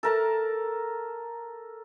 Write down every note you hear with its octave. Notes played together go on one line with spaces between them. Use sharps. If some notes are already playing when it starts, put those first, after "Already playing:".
A4 A#4 A5